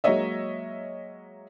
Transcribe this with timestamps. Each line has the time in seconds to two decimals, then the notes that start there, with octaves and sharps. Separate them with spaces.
0.04 F#3 G#3 A#3 C#5 D#5 E5